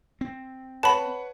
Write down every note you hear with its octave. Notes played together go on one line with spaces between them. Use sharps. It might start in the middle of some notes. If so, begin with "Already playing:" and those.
C4
B4 C#5 F#5 A5 B5